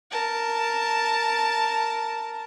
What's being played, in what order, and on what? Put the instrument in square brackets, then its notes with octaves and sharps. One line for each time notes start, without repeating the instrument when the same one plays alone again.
[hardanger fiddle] A#4 A5